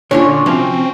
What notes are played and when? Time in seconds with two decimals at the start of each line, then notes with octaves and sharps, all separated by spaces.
0.11 A#2 D3 C#4 D4 F4 C#5
0.46 C3 F3 F#3 C4 C#4